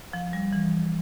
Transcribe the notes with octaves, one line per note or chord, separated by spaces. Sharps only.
F3
G3
E3